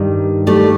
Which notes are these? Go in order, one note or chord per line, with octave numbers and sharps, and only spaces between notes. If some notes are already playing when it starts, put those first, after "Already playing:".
Already playing: G2 D#3 G3
G3 A3